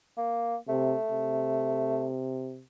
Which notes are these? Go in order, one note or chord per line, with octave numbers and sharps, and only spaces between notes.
A#3
C3 A3
C3